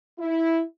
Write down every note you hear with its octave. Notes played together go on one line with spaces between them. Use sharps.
E4